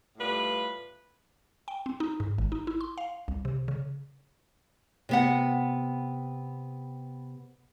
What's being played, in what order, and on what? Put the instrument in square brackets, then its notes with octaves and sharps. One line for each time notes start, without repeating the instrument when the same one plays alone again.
[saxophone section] A2 G3 F4 B4
[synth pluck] G5
C4
D#4
G#2
G#1
D#4
E4
C6
F5
C2
C3
C#3
[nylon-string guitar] C3 B3 F#5